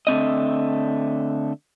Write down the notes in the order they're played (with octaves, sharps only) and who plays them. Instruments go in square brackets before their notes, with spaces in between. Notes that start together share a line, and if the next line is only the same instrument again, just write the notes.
[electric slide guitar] D3 A3 C4 D#5